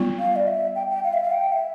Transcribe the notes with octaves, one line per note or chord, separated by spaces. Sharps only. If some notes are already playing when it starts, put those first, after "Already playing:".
Already playing: G3 B3 F4
F5
D5
E5
G5
G5
F5
E5
F5
G5
E5